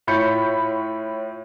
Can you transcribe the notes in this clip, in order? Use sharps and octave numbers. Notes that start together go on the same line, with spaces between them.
A2 F4 C#5 B5 G6 C#7